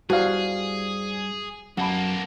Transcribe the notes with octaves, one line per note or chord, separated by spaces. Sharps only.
G2 E4 F#4 G#4 C5 D5 F5
B1 F#2 A#3 F#5 A5 B5